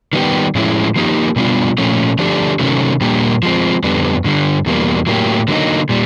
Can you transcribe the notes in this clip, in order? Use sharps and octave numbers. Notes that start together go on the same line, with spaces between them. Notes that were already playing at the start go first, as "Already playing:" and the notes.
D#3 G3 B3 E4 G4
A2 F3 G#3 C#4 E4
F3 A#3 D#4 G4
B2 G3 B3 D4 F4
A#2 F3 A3 C#4
D3 F3 A3 D4 G4
C3 D#3 F#3 A3 C#4
A#2 G3 A#3 D4 G4
F3 G#3 C4
F2 D3 G3 B3
G2 D3 G3
E2 B2 G3 A#3
A2 F#3 A#3 D#4 G4
D3 F#3 A#3 D#4
A#2 G3